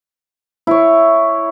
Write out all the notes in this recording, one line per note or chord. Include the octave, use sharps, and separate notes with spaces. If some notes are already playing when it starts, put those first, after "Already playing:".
E4 C#5